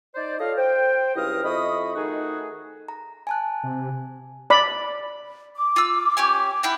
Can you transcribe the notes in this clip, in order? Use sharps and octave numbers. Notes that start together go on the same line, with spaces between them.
D#4 C5 D5
F4 A4 C#5 D#5 F5
C5 G5
C#2 G2 E4 D#5 F5 D#6
F2 E4 D#5 B5 C#6 D#6
D#3 A3 D#4 F#4 G#4
A#5
G#5 A5 F#6
C3
D5 B5
D6
F4 E6
C#4 G4 G#5
E4 F#5 G5